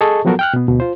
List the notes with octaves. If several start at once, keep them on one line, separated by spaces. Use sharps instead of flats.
G#4 A4 D#5 A5 C#6
F3 F#3 B3 F#4 A4 A#4
G5 F6 F#6
B2 B3
D2 B2
F4 C5